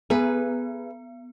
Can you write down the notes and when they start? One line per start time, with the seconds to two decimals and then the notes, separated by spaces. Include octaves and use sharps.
0.10 B3 G#4 B4